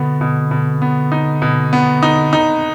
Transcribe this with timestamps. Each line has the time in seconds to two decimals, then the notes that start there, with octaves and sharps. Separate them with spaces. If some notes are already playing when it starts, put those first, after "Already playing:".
Already playing: B2 D3 B3
0.21 B2
0.51 B2
0.82 B3
1.12 D#4
1.42 B2
1.73 B3
2.03 D#4
2.33 D#4